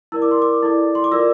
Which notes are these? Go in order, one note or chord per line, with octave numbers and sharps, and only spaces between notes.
E4 A#4 D5 E6
D6
C6
D6
E4 A4 D5
C6
D6
F4 A#4 D5 E6